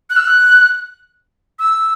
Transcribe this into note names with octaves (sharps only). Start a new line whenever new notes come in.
F#6
E6
F#6
E6